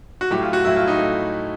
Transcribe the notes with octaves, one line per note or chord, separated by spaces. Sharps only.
F#4
A2 F#3 A3 G4
F4
F#4
A2 F#3 A3 E4
F4
D#4
A3